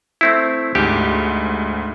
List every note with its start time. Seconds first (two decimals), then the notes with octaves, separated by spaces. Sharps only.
0.21 A3 C4 E4
0.75 D2 G#2 G4